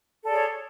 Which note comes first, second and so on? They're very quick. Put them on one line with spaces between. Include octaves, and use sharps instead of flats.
A4 D5 G#4 C#5